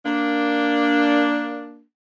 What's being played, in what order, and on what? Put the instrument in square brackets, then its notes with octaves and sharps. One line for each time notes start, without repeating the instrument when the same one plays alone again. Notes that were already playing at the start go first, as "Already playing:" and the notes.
[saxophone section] A#3 D4